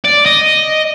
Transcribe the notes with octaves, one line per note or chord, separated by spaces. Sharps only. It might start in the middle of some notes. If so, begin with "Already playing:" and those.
D5
D#5